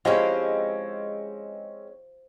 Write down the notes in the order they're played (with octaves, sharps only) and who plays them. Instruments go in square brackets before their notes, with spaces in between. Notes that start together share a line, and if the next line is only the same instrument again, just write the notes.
[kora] F3 E4 G4 [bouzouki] G#3 C4 C#4